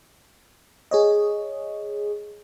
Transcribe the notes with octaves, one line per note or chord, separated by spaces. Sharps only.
G#4 C#5 D#5